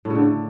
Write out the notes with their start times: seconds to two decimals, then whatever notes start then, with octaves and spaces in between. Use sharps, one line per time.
0.05 A2
0.10 C#3
0.15 D3